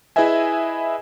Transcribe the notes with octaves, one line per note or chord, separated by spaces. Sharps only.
E4 G#4 B4 D#5 E5 G#5